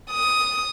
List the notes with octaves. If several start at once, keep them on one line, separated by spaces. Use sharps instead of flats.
D#6